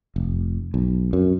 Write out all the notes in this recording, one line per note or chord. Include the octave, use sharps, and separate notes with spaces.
F1
B1
F#2